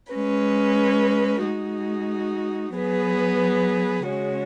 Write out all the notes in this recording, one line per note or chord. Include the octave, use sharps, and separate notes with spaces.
G#3 C#4 B4
G#3 D#4 F#4
F#3 B3 G#4 B4
C#3 G#3 C#4 F#4